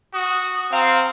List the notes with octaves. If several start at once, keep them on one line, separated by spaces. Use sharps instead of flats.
F#4 D#6
C4 F5 A#5